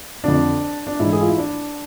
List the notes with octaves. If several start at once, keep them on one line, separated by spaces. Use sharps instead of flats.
F2 D3 D4
D4
G#2 E3 E4
G#4
F4
E4
D4